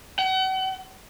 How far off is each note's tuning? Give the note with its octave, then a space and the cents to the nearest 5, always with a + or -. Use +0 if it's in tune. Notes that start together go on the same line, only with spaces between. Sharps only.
F#5 +40